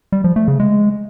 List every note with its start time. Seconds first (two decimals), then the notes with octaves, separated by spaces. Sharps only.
0.12 G3
0.24 F3
0.36 A3
0.48 C#3
0.60 G#3